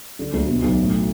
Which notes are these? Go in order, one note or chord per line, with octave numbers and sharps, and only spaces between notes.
D3
D2
B2
B1
A2